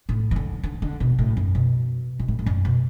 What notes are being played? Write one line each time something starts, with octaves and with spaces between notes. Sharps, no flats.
A2
E3
D3
D3
D3
B2
A2
F#2
B2
B2
A2
A2
F#2
B2